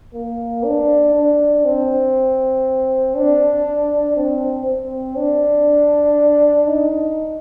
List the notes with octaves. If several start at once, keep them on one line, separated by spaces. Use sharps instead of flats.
A#3
D4
D4
C4
D4
C4
C4
D4
D#4